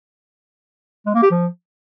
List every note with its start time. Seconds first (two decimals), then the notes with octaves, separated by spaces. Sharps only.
1.06 G#3
1.14 A#3
1.23 G4
1.31 F3